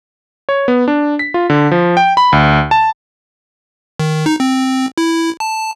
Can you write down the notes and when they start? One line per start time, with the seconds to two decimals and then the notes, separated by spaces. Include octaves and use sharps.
0.49 C#5
0.68 B3
0.88 D4
1.19 B6
1.34 F4
1.50 D3
1.71 F3
1.97 G5
2.17 B5
2.32 D2
2.71 A5
4.00 D#3
4.26 D#4
4.40 C4
4.98 E4
5.40 A5